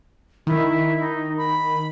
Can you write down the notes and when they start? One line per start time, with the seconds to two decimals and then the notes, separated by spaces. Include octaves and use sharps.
0.47 D#3 E4
1.00 D#4
1.38 B5